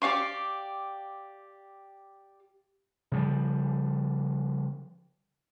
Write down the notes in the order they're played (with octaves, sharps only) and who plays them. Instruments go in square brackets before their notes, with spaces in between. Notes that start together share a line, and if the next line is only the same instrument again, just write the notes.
[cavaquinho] G4 D5 F5 C#6
[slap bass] C#3 F3 G3